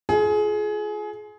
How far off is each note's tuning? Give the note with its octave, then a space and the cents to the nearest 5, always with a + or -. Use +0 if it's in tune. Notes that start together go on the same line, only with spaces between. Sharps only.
F4 +0 G#4 +25